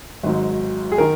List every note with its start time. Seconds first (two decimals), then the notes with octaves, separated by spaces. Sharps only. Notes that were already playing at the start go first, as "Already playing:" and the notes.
0.23 G#1 G#2 F#3
0.92 G#4
0.98 D#3 A#4